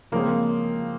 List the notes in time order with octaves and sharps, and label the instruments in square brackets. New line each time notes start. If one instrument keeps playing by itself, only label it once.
[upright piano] C#3 F3 G#3 C4 [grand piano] A#3